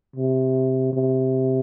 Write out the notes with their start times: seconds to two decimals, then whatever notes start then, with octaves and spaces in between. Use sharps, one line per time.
0.16 C3
0.93 C3